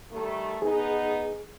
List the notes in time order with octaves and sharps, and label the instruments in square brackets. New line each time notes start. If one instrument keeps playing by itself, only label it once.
[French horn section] D#3 G3 A3
[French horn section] B3 D#4 [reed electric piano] G#4